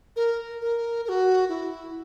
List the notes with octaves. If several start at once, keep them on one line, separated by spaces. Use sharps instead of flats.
A#4
A#4
A#4
F#4
E4